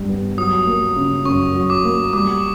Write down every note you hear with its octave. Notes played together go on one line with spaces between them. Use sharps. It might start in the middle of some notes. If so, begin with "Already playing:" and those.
Already playing: G2 G3
B3
F#3 D#6
A#3
C#3
F#2 C#6
F#3
D6
A#3
G3 D6